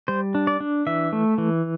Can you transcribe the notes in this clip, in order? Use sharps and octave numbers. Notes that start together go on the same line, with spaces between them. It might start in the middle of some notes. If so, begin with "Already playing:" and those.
G3 C5
D4
D5
D4
E3 E5
A3
E3